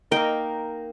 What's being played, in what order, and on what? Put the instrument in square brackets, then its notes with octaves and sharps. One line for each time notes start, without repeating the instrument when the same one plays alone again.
[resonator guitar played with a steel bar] A#3 D#4 A#4 [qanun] G5